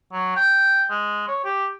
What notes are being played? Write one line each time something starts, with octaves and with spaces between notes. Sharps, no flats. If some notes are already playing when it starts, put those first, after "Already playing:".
F#3
G5
G#3
C#5
G4